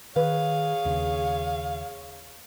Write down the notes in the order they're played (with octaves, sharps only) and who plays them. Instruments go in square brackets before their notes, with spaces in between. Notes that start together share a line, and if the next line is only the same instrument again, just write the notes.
[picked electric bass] D#3 [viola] G#4 C#5 [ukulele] B4 [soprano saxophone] F5
[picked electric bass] D#2 C#3